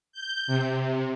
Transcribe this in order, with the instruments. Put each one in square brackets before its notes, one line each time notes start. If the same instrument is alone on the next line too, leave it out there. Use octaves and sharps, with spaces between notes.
[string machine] G6
C3